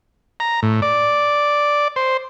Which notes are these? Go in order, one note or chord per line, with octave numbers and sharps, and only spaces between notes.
A#5
A2
D5
C5